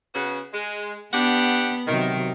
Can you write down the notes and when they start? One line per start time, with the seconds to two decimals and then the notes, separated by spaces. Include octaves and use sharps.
0.15 C#3 B3 F#4
0.54 G#3
1.14 B3 D4 G4 F#5
1.87 C3 D#3 F#3